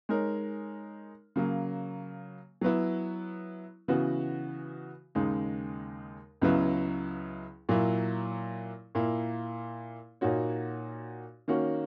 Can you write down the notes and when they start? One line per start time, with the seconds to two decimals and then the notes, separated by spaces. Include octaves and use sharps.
0.09 G#3 D#4 A#4 C#5
1.36 C#3 F#3 A#3
2.61 F#3 B3 E4
3.88 C#3 E3 B3 F#4
5.15 D#2 C#3 G#3 D#4
6.41 C#2 C#3 F#3 B3 E4
7.69 A#2 F#3 A#3 E4
8.95 A#2 A#3 E4
10.21 A#2 A#3 D#4 F#4 C#5
11.48 D#3 A#3 C#4 F#4